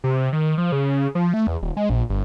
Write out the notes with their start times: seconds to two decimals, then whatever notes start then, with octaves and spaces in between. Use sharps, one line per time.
0.04 C3
0.33 D#3
0.58 F3
0.72 C#3
1.15 F3
1.34 A3
1.47 E2
1.62 D#1
1.77 G#3
1.90 A#1
2.10 G1